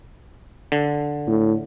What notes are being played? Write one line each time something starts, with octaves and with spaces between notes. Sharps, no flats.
D3
A2